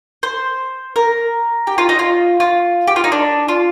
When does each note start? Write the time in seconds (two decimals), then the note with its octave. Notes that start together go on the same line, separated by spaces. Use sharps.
0.23 C5
0.96 A#4
1.67 G4
1.78 F4
1.89 D#4
1.99 F4
2.40 F4
2.87 G4
2.96 F4
3.04 D#4
3.12 D4
3.48 F4